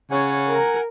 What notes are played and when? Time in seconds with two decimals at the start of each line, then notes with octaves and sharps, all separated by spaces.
0.11 C#3 C#5 F#5 G#5
0.47 A#4 A#5